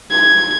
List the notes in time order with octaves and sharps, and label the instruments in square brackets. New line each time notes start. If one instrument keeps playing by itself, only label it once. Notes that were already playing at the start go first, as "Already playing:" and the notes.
[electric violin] G#6